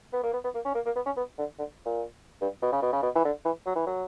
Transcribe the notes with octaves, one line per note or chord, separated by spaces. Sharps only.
B3
A#3
B3
B3
A#3
C#4
A#3
A#3
B3
C#4
B3
D3
D3
A#2
G2
B2
C#3
B2
C#3
B2
E3
D3
E3
F#3
E3
F#3